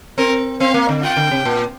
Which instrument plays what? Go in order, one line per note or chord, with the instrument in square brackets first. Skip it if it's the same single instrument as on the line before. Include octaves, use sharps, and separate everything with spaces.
[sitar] C4 [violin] A#4
[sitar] C4 [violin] F5
[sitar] A#3
D3
[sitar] F4 [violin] G5
[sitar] D3
C3
A#2